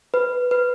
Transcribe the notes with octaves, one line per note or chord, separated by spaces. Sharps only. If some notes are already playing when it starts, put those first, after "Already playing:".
B4
B4